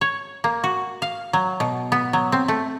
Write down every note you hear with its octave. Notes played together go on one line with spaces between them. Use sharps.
C#5
A#3
F#4
F5
F#3
B2
B3
F#3
C4
A3